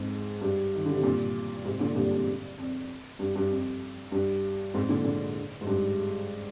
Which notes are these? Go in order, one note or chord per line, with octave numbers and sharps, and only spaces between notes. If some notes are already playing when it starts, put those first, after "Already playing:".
Already playing: F2 G#2
G2
D#3
D3
C3
G2 A#2
G#2 C3
A#2 D3
G2 A#2
F2
F2
G2
G2
F2
G2
F2 G#2
A#2 D3
A#2 D3
G#2
G2